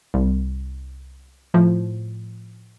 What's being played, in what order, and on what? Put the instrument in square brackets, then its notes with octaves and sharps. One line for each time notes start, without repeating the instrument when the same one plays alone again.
[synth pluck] C2
A2 F3